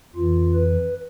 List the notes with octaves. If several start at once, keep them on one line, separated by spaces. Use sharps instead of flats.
F2 E3 F4
B4